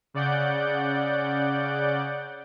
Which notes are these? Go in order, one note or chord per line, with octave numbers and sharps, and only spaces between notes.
C#3 D5 F#5 G6